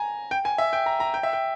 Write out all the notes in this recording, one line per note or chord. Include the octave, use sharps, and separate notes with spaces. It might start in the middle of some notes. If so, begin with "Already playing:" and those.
Already playing: G#5 A#5
G5
G#5
E5
G5
A#5
A#5
G5
E5
G5